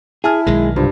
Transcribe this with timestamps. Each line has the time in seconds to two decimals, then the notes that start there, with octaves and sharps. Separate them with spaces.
0.24 E4 G#4 G#5 A5 F6
0.47 B1 D#3 G#3
0.76 C2 G2 F3